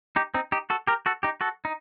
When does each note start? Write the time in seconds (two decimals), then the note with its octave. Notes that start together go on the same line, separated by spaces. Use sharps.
0.16 D#4 G4
0.34 C4 D#4
0.52 D#4 G4
0.70 F#4 A4
0.87 G4 A#4
1.06 F#4 A4
1.23 D#4 G4
1.41 F#4 A4
1.65 D#4